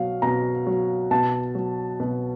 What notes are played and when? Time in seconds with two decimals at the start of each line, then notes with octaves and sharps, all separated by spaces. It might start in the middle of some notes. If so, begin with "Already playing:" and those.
Already playing: B2 F#3 F5
0.22 B2 A#5
0.67 F#3
1.11 B2 A5
1.55 F#3
2.00 B2